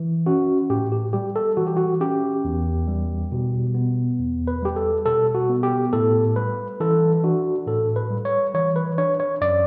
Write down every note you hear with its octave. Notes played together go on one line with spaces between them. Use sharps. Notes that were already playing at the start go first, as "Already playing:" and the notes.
Already playing: E3
C#4 F#4
A2 G4
G4
G3 G4
A4
E3 F#4
G4
F#4
C#4 G4
E2
G3
B2
B3
E2
B4
G3 G4
A4
B2 A4
F#4
B3
G4
A2 A4
G3 B4
E3 A4
D4 F#4
A2 A4
B4
G3
C#5
E3 C#5
B4
D4 C#5
C#5
F#2 D5